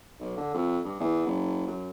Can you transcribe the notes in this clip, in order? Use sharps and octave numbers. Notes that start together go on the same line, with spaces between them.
B1
D3
F2
G2
E2
F#1
F#2